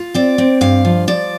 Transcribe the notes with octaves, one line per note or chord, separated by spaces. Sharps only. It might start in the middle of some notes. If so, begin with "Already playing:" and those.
Already playing: F4
C4 D5
C4
G2 F5
F3
F3 D5